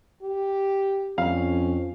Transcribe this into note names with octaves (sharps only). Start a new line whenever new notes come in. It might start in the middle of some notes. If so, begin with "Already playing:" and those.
G4
F2 C#4 F5